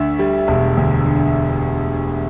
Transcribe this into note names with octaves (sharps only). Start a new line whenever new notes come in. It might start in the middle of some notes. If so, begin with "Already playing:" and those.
Already playing: D2 D3 E5
G3
E1
D2
D3